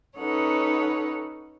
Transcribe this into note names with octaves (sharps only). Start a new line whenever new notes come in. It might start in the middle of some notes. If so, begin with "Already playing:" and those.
C#4 D#4 A4 B4 C#5 F#5